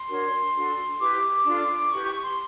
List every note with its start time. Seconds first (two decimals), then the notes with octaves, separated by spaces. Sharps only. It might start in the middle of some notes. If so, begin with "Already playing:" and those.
Already playing: C6
0.08 D4 F#4 A#4 C#5
0.54 D4 F#4 A4
0.99 E4 G4 B4 D6
1.45 D4 F4 A4
1.90 E4 G4 B4 C#6
2.06 C#6
2.21 C6